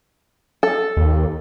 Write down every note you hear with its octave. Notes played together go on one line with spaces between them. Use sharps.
A4
D#2